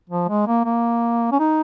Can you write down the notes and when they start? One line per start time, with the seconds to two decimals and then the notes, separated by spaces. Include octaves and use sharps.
0.10 F3
0.28 G#3
0.47 A#3
0.65 A#3
1.32 C#4
1.39 D#4